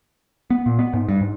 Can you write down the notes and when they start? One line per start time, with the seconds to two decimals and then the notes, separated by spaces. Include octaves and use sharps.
0.50 B3
0.66 A#2
0.79 B3
0.94 G#2
1.09 G2
1.21 G#2